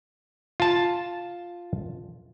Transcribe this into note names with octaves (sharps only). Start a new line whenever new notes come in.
F4 A5